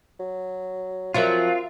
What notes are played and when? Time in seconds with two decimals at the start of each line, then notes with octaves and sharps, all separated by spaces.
0.20 F#3
1.14 F3 F#3 C4 F4 A#4 E5 F5